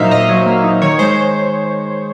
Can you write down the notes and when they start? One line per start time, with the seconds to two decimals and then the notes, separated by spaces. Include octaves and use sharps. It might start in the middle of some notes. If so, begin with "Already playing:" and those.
Already playing: A#2 F#3 A#3 D#4 C5 E5 F5
0.11 A#2 D#5
0.29 F#3
0.46 A#3
0.64 D#4
0.82 D#3 C#5
0.99 G#3 C5